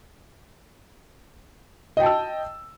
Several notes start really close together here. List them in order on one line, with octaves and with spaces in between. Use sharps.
D#5 G5 A5 E6